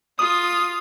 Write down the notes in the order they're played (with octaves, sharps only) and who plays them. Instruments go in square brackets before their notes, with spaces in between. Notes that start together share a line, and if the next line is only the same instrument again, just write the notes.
[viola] F4 [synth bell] D#6